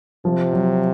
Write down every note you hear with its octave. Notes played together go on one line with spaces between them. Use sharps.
C3 F3
F#3